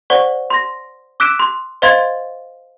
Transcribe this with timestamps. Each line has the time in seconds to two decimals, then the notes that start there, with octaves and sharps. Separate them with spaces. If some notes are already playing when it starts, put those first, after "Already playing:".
0.10 C5 D5 F#5 C#6
0.50 C6 A#6
1.20 D6 E6 F#6 B6 D7 E7
1.39 C6
1.82 C5 D#5 F5 C6 G#6 A6